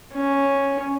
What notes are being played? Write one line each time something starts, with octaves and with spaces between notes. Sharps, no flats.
C#4